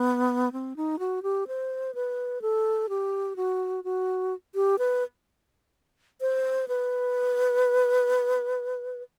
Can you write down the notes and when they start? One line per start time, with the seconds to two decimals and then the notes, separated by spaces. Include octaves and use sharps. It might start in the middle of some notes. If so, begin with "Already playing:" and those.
Already playing: B3
0.52 C4
0.76 D#4
0.99 F#4
1.23 G4
1.47 C5
1.95 B4
2.42 A4
2.89 G4
3.36 F#4
3.84 F#4
4.55 G4
4.79 B4
6.21 C5
6.68 B4